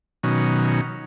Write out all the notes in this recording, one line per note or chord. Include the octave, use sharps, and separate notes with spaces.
B2 D#3 F#3 C#4